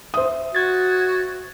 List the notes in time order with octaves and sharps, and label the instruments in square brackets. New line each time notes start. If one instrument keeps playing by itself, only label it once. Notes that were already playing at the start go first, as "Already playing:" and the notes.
[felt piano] C5 E5 D#6
[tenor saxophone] F#4 [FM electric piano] G#6 A6